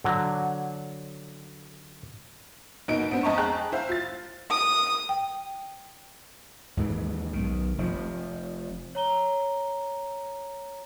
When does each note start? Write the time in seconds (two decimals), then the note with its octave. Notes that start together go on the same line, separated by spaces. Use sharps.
0.04 D3 F#3
2.88 F#1 B2 D#4 D7
3.11 B3 C4 D4
3.23 F2 D#5 A5 A#5 C#6
3.38 G#4 G5 A5 A#5 F#6
3.72 E4 C5 F5
3.89 F4 A6
4.51 D#6
5.09 G5
6.77 D#2 G#2 C#3 E3
7.33 B1 D#3
7.78 F1 F3
8.95 C#5 A#5 G7